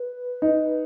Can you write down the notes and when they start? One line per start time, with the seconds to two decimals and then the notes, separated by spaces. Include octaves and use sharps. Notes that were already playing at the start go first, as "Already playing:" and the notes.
Already playing: B4
0.42 D#4